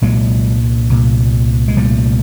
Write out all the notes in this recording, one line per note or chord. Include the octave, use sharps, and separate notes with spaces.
C2 A#2 F#3 G#3
C2 A#2
G#3
C2 A#2 G3 A3